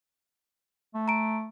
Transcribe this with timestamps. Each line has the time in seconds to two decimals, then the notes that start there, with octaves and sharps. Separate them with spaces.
0.94 A3
1.08 A#5 D7